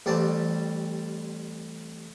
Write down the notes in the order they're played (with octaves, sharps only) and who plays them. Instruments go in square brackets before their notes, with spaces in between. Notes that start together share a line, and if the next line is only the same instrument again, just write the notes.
[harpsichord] A1 G3 C4 A5